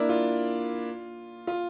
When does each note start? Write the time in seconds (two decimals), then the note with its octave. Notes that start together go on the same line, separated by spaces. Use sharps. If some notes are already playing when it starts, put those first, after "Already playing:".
Already playing: A#3 D4 E4
0.09 F4
1.47 F4